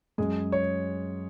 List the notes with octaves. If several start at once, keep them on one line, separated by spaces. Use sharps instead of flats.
F#2 G#3 G#4
C#5